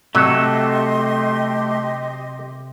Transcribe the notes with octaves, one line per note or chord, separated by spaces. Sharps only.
C3 F#3 A3 G4 A4 D#5 C6